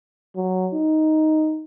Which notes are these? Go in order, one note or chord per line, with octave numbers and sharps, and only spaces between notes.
F#3
D#4